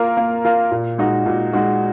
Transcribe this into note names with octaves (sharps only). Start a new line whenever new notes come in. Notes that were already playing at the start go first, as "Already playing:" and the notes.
Already playing: A#3 F4 A#4
A#3
F4 A#4
A#2
G#3 D#4 F#4
A#2
G#3 D#4 F#4